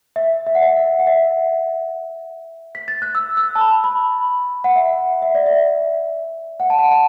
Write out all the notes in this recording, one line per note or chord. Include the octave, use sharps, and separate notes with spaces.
E5
E5
F#5
E5
E5
F#5
E5
B6
A6
F#6
E6
E6
A5
B5
B5
F#5
E5
E5
D5
E5
F#5
A5
F#5
A5